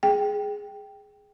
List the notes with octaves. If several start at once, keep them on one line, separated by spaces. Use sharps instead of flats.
G#4 G5